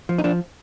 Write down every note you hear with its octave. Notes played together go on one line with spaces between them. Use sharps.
F3
D#4
F3 D4